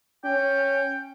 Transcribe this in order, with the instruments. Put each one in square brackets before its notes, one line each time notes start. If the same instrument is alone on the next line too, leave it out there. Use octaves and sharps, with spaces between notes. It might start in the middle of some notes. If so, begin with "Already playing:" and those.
[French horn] C#4 [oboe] G5